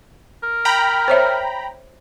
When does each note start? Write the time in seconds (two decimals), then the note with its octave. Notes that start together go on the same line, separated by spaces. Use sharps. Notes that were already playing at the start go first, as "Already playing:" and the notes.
0.43 A#4
0.65 G5 A#5 B5
1.08 C5 C#5 E5